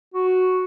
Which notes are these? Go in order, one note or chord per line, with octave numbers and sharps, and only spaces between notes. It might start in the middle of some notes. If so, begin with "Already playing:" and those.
F#4